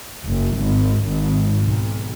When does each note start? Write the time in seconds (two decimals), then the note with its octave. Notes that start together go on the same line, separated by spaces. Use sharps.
0.25 F#1
0.59 G#1
1.02 G#1
1.63 B1